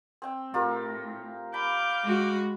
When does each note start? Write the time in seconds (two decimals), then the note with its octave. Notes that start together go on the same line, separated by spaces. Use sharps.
0.22 C4 G5
0.54 A2 F4 G4 A#4
1.54 F5 B5 D6 G6
2.04 G#3 F#4